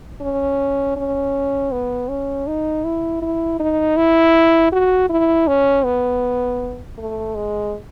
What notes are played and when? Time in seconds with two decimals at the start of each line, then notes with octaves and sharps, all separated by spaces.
0.21 C#4
0.96 C#4
1.71 B3
2.09 C#4
2.47 D#4
2.84 E4
3.22 E4
3.59 D#4
3.97 E4
4.72 F#4
5.09 E4
5.47 C#4
5.85 B3
6.98 A3
7.35 G#3